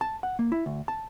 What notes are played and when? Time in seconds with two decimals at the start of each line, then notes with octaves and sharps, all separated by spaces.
0.01 A5
0.23 F#5
0.39 A#3
0.52 E4
0.66 D2
0.88 A5